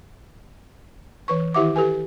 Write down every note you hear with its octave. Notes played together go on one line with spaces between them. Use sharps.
E3 B4 C#6
D#3 E4 G4 E5 F#5 D6
G4 A4 B4 G#5